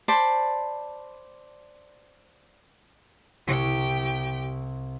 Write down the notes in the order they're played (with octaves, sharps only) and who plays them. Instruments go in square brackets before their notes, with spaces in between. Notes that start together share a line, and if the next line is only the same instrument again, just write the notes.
[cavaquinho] C5 D5 A5 B5
[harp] C2 C3 C#6 [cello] G4 G5